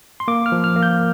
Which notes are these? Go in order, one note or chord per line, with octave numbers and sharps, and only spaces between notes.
C6
A#3 D6
F6
F3
F6
A#3
G6